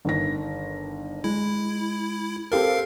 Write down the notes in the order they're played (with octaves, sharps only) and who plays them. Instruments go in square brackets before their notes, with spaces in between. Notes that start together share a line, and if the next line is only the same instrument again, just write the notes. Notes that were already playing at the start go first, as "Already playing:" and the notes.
[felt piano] G1 D#3 A#6
[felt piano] G#3 [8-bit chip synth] E4
[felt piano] C4 G4 A4 [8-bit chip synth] A#4 F5